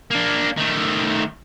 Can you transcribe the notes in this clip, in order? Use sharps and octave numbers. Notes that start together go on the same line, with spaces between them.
A#3 D4
D#3 A3